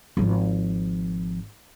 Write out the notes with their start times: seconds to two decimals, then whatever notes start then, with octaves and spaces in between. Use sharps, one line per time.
0.17 G#1 F3